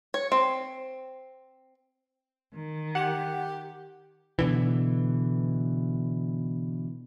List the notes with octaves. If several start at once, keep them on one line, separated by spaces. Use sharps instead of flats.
C#5
C4
D#3
G4 F#5
B2 D3 E3